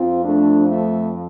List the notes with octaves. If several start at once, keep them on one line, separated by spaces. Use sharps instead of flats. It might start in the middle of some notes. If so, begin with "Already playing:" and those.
Already playing: F2 F3 C4 F4
A3 D4
A3